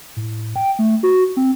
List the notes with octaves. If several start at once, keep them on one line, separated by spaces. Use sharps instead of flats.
A2
G5
A3
F#4
C4